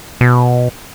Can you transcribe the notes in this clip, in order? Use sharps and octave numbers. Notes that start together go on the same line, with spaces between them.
B2